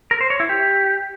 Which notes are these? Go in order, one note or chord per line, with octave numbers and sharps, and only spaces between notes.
A#4
C5
C#5
E4
G4